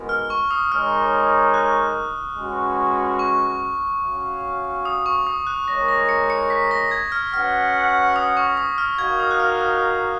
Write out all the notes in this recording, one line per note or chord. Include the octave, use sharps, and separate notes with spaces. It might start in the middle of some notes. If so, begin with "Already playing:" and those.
Already playing: G#3 B3 D#4 F#4 A#4
F6
C#6
D#6
G#3 D#4 A#4 C#5 F6
F#6
G#3 C#4 F#4 B4
C#6
C#4 F#4 C#5 F5
D#6
C#6
D#6
F#6
G#3 D#4 A#4 C#5 A#6
A#6
C#7
C#7
B6
A#6
G#6
F6
C#4 F#4 B4 F#5 F6
D#6
C#6
D#6
F6
D#4 F#4 A#4 F5 G#6
D#6
F#6
F6
D#6